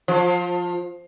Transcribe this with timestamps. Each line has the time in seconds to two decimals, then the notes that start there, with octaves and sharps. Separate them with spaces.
0.08 F3